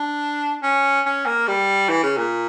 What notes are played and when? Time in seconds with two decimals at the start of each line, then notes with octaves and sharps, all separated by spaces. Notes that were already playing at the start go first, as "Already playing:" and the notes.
Already playing: D4
0.63 C#4
1.06 C#4
1.26 A#3
1.48 G3
1.89 E3
2.03 C#3
2.18 A#2